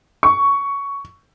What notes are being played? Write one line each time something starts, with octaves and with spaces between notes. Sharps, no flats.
C#6